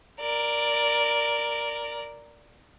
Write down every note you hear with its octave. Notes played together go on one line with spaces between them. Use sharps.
A#4 D5